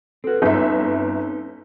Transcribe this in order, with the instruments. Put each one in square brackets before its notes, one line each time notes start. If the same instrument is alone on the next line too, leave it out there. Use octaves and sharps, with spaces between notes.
[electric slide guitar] C4 F#4 [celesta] A4 B4
[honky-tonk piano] G1 E5 [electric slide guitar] C4 C#4 D#4